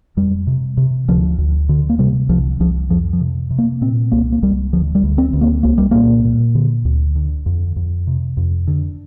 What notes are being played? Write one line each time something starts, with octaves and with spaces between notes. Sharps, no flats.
F2 G3
C3
C3
D2 F3
D2
D3
A#3
C3 G3
C2 F3
C2 F3
F2 F3
F3
C3
C3
A#3
A#2 C4
C2 A#3
A#3
C2 G3
D2 F3
G3
D2
C4
D2
A#3
C2 A#3
G3
A#2 A#3
A#2
D3
D2
D3
F2
F2
C3
F2
D3